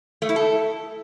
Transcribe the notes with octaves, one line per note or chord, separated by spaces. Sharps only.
A3
E4
A4